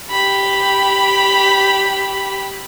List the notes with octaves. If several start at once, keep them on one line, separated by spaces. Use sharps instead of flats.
G4 B5